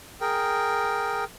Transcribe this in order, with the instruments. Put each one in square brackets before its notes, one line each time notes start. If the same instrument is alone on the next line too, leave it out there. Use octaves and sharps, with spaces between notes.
[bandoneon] G#4 A#4 G5